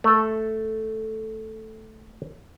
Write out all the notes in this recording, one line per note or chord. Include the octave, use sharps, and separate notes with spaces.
A3 A4